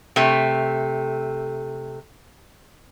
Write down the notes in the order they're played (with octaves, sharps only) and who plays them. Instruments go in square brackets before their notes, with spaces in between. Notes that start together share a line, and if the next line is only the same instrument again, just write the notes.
[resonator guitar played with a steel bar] C3 A3